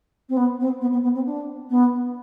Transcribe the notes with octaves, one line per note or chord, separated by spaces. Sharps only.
C4
B3
C4
B3
B3
B3
C4
D4
B3